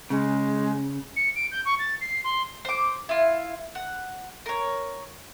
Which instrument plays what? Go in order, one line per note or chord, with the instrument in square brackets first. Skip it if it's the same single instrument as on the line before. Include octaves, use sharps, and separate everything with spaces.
[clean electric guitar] C#3 [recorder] G#3
[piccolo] C#7
D7
G6
C#6
A6
C7
C6
[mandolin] C5 D6
E4 F4
F#5
A#4 C#5